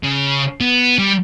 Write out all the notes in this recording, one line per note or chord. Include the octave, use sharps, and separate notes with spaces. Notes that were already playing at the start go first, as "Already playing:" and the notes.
C#3
B3
G3